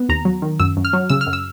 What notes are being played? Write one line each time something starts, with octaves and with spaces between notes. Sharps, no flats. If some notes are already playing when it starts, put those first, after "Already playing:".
Already playing: B3
D#2 A#5
F#3
D#3
F#2 E6
F#2
F6
F#3
C#3 E6
F6
F#2
E6